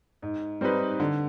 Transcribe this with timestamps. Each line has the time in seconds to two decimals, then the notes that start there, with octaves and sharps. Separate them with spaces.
0.22 G#2
0.61 G3 C4 D#4 B4
1.00 D3